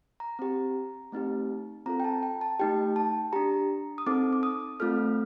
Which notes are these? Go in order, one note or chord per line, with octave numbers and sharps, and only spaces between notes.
A#5
C4 G4
A3 C4 D#4 G4
C4 F4 A4 A#5
G5
A5
G5
A5
A3 D#4 G4 G5
A5
D4 G4 A#5
D#6
C4 D#4 A4 D6
D6
D#6
A3 C4 F4 A4 F6